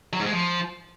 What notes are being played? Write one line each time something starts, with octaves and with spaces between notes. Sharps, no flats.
F#3
G#2
G#3
F3